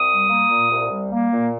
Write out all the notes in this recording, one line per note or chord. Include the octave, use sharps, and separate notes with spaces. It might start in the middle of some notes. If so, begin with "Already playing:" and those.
Already playing: C2 D#6
G3
A#3
A#2
C2
G3
A#3
A#2